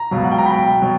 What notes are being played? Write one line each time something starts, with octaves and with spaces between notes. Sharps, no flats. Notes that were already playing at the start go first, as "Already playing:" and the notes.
Already playing: A#5
C#2 B2 F#3
F#5
G5
A#5
G5 B5
B2 F#3